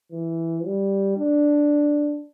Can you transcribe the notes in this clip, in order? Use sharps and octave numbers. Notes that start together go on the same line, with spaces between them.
E3
G3
D4